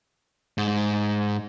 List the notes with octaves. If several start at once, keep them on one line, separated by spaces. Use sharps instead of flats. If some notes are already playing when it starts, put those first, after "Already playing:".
G#2